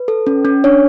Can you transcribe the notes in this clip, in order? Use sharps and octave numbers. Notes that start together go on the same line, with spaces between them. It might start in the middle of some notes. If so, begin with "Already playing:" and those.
Already playing: B4
A4
C#4
C#4
D4 C#5